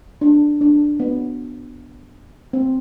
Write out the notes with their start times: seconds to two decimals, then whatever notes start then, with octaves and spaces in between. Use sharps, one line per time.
0.21 D4
0.61 D4
1.00 B3
2.53 C4